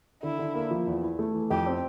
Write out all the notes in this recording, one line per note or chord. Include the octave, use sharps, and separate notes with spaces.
D3 E4
D3
A#3
F3
E2
E4
A3
E3
F2 G4
C4